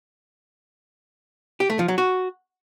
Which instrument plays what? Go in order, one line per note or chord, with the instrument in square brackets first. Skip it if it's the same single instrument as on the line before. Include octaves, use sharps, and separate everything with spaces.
[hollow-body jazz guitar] G4
A3
F3
F#3
F#4